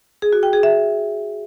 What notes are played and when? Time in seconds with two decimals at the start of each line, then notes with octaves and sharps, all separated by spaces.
0.22 G#4
0.33 F#4
0.43 G5
0.53 G#4
0.63 E5